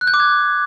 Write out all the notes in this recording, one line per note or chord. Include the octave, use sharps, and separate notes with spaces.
F#6
G6
D6
G#6